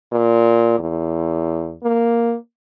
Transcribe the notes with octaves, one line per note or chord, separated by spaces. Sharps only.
A#2
E2
A#3